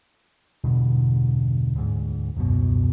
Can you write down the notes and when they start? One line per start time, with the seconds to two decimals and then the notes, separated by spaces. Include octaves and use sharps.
0.64 E2 G2 B2 D3
1.76 D2 G#2
2.36 D#1 C#2 F#2 B2